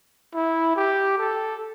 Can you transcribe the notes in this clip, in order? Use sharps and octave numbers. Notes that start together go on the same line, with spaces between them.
E4
G4
A4